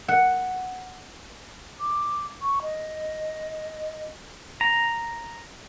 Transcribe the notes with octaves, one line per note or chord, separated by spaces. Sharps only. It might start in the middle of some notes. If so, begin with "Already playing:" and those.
F#5
D6
C#6
D#5
A#5